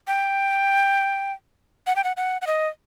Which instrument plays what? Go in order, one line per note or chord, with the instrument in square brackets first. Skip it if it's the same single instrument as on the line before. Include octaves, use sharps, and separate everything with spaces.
[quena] G5
F#5
G5
F#5
F#5
F#5
D#5